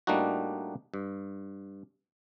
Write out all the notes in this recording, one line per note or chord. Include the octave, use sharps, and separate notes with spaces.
A2 G3 A#3 D4 D#4 F#4
G2